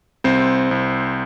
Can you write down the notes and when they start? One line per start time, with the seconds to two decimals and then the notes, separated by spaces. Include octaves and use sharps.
0.24 C2 C4 C5
0.71 C2